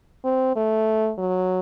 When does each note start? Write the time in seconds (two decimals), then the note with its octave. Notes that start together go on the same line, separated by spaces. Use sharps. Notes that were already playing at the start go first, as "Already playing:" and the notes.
0.24 C4
0.56 A3
1.18 F#3